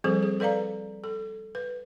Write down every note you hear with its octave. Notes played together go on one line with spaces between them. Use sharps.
F3 G3 C4 G#4 A4 C5
G#4
A4 B4 D5 F5 A#5
A4
B4